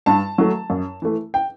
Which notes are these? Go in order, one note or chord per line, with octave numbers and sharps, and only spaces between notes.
G2 A5
F#3 A3
F#2
E3 A3
G5